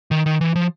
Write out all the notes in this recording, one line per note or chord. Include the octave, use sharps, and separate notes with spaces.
D#3
D#3
E3
F3